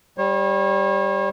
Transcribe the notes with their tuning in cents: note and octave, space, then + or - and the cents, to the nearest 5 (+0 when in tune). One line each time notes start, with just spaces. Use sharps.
G3 +0 C#5 -40